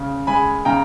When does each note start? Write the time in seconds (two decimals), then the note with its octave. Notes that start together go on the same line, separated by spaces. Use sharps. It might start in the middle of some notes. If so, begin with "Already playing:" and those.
Already playing: C#3
0.27 G#3 G#5 B5
0.65 C#3 G5 A#5